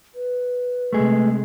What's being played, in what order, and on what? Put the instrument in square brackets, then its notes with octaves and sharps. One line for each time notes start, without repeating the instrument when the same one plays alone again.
[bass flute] B4
[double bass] C3 G#3 [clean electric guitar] A3 G#4